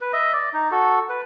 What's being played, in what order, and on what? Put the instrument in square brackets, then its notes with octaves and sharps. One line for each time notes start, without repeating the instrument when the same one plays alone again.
[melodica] B4
D#5 E5
D5
D#4
F#4 A4
B4